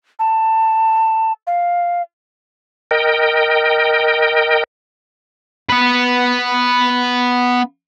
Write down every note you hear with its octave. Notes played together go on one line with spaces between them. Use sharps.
A5
F5
A#4 D#5 G5
B3 B4